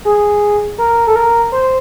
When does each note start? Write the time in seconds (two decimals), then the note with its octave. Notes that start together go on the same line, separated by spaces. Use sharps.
0.05 G#4
0.78 A#4
1.07 A4
1.16 A#4
1.52 C5